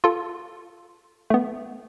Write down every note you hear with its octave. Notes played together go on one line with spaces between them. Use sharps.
F4 A4
A3 B3